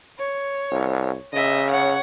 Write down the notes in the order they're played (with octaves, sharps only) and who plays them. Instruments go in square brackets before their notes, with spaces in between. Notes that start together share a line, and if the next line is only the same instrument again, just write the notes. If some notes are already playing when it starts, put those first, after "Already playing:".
[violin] C#5
[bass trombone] C2
[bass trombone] C#3 [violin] D#5 E5
[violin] C#5 F#5